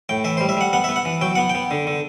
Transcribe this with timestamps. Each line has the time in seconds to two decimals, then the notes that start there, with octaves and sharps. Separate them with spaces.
0.09 A2 G5
0.24 E3 E5
0.37 C5
0.41 G3
0.49 E5
0.57 G3 F#5
0.73 B3 F#5
0.84 B3 E5
0.96 F#5
1.05 E3
1.21 F#3 G5
1.35 B3 F#5
1.50 G5
1.55 B3
1.71 D3
1.87 D3